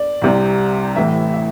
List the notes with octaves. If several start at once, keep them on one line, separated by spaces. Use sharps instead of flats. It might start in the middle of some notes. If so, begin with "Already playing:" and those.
Already playing: D5
C2 C3 G3
A1 A2 E3 E5
E5